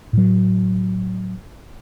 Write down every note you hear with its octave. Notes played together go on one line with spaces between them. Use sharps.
A2 F#3